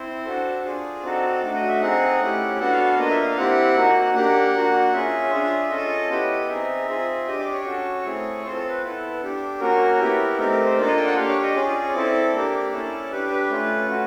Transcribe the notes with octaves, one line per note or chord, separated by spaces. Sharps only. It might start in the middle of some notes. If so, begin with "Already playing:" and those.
Already playing: C4 E4 C5
D4 F#4 A4
D4 F4 G#4 D5
C4 D#4 F#4 A4
A3 D4 F#4 D5
D#5
E5
C4 D#4 G#4 F#5
A3 C#4 E4 G4
B3 D4 F#4 A4 F#5
F5
F5
A#3 D4 F4 D#5
E5
F5
C4 E4 G4 F#5
A#3 D#4 F#4
A#3 D4 G4 F#5
A#3 D4 F#4
C#4 F4 G#4 E5
D4 F4 G#4
C#4 F4 A4 D#5
B3 E4 G4
C4 D#4 G#4 E5
C4 F4 G#4
D4 G4 D#5
D5
C#5
C#4 F#4 A4
A3 C4 E4 G#4
C4 F4 A4 C5
A4
B4
B3 E4 A4
D4 G4
A#3 C#4 F#4 A#4
B3 E4 G4
A3 C4 D#4 G4 A#4
A#4
C5
A#3 D4 F4 A4 D5
D#5
G5
F#5
D4 G4 F5
C#5
D#5
C#4 F4 G#4 D5
C4 E4 A4
A#3 D4 G4
C#4 E4 A4
D4 G4 B4
B4
A3 C#4 F4
A3 C#4 F#4